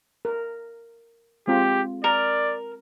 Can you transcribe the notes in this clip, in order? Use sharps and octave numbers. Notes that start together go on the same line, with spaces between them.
A#4
G#3 C4 F4 G4
A#4 D5